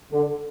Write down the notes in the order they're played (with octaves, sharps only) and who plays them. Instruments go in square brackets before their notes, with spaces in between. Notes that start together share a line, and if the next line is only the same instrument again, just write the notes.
[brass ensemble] D3